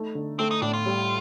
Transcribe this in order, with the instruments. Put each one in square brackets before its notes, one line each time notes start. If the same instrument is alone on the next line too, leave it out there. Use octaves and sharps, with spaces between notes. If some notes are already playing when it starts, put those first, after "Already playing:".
Already playing: [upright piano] A3 D#4
D3
[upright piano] A3 [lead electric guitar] C4
[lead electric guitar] D#4
[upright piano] A2 [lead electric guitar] D4
[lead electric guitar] F4
[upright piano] G3